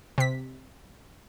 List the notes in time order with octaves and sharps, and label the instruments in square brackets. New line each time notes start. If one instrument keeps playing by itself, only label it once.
[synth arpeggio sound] C3 B6